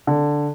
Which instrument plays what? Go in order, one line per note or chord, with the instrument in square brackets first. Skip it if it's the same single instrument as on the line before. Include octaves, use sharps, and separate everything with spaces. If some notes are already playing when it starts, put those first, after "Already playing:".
[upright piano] D3